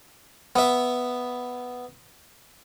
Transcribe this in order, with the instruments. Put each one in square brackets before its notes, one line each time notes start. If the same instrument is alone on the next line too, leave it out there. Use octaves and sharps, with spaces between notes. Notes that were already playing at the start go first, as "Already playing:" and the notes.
[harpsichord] B3 E5